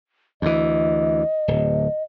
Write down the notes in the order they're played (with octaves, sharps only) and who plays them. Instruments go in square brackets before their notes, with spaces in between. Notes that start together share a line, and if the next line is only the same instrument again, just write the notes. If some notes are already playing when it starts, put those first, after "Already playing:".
[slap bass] D2 E3 [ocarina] D#5
[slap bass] D1